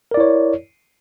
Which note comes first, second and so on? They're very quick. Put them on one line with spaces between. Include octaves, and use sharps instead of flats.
A#4 D5 E4 C#5